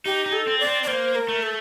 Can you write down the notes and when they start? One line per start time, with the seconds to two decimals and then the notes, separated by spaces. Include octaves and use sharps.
0.05 D#4 G4
0.26 D#4
0.32 A4
0.47 C4
0.60 D5
0.67 C4
0.83 D5
0.87 A#3 C5
1.15 A#4
1.28 A3
1.42 A4